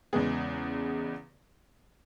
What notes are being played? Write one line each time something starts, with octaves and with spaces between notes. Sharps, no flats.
E2 C#3 G#3 B3 G#4